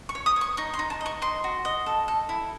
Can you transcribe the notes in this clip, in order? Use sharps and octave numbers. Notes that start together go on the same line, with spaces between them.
C#6
C#5
D#6
C#5
C#6
D#4 C#6
C6
D#4
A5
D#5
C#6
D#5 C6
F#4
D#5
A4
A4
E4